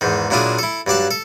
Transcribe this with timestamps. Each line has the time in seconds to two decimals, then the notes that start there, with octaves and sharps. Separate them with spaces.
0.01 E2 G#2 D#3
0.30 A#2 F#3 D4 E4 F4 G#4
0.59 E4 A4
0.86 G2 F#3 D5 A5
1.11 A4